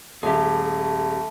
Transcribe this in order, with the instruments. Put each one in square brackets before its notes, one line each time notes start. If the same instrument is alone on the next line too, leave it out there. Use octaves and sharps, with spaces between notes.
[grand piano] D#1 [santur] A3 [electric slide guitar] G4 G#4